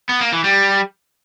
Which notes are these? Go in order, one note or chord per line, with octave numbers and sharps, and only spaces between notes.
B3
A#3
E3
G3